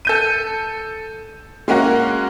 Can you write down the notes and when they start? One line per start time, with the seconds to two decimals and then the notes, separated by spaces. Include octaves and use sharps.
0.05 A4 G6 D#7
1.68 G#3 A#3 C#4 F#4 A#4